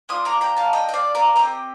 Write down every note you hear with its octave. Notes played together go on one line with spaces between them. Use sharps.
A#3 D4 F4 C6 D#6
A#5 D6
G5 A#5
F5 A5
D#5 G5
G5
D5 F5
A#4 D5
C4 G4 C5 D#5